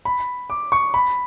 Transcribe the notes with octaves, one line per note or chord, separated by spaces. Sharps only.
B5
D6
C#6
B5